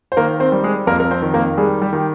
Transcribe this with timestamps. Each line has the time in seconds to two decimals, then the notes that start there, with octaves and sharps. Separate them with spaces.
0.12 C5
0.17 D#3 A#3 A#4
0.40 C4 C5
0.52 G3
0.64 G#3 G#4
0.87 F2 A#3 A#4
1.00 A#4
1.11 C4 C5
1.22 D#3
1.34 A#3 A#4
1.57 G3 G#3 G#4
1.81 G3 G4
1.93 D#3 G4